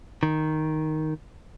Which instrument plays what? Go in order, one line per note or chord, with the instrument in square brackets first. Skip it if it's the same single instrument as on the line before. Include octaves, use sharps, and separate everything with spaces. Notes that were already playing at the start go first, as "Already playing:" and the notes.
[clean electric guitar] D#3